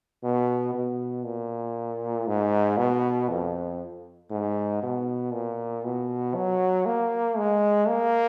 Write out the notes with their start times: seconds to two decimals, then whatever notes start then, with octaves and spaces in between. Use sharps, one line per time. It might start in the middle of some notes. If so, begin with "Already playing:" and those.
0.24 B2
0.74 B2
1.25 A#2
2.27 G#2
2.78 B2
3.29 F2
4.31 G#2
4.83 B2
5.33 A#2
5.84 B2
6.35 F#3
6.86 A#3
7.38 G#3
7.88 A#3